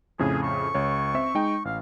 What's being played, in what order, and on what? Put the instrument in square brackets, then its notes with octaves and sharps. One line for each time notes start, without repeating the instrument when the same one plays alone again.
[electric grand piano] F2 A2 C#3 [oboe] G#4
[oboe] C#6
[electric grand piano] C#2 C#5
C4 E5
G#3 D#4 G5
[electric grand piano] A1 [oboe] F5